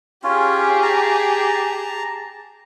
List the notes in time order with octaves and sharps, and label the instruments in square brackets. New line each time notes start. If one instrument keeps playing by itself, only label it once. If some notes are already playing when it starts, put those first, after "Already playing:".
[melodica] C#4 F4 [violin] G4 G#4
[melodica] A5 A#5